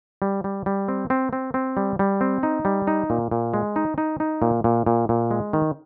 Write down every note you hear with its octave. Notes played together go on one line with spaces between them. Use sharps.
G3
G3
G3
C4
C4
C4
C4
G3
G3
C4
D#4
G3
D#4
A#2
A#2
G#3
D#4
D#4
D#4
A#2
A#2
A#2
A#2
G#3
D#3